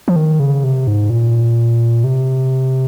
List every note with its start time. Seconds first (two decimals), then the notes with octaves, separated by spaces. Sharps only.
0.08 F3
0.16 D#3
0.40 C#3
0.64 C3
0.87 G#2
1.10 A#2
2.04 C3